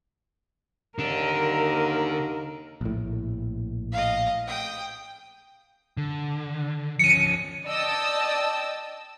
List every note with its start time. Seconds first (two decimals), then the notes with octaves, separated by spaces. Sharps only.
0.99 D#2 D3 D4 A#4
2.81 A#1 A2
3.92 D#5 F5
4.47 G5 D#6
5.97 D3
6.99 F3 C#4 C#7 D#7
7.66 D5 D#5 G5 A5 D#6 E6